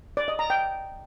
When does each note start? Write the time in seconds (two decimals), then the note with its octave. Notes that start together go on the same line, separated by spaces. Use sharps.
0.17 D5
0.28 D#5
0.39 A#5
0.50 G5